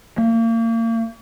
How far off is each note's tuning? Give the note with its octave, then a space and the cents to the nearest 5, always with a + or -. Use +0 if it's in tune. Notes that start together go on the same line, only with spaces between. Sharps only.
A#3 -35